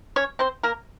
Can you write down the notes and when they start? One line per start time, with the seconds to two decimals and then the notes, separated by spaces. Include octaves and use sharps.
0.16 C#4 C#5
0.39 C4 C5
0.63 A#3 A#4